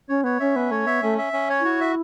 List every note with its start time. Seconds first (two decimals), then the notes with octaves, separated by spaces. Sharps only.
0.09 C#4 C#5
0.24 B3 C#5
0.40 C#4 E5
0.55 B3 C#4
0.71 A3 C#5
0.86 B3 E5
1.02 A3 C#4
1.18 E5
1.33 C#4
1.50 C#5
1.60 E4 F#4
1.80 E5